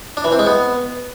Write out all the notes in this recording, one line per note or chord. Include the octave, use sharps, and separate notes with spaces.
D4
E3
C4
G#3
B3